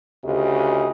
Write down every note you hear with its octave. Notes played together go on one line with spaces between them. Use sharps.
D2 C#3 F4 G4 G#4 D#5